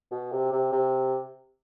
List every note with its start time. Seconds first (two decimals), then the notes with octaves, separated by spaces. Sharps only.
0.11 B2
0.32 C3
0.52 C3
0.72 C3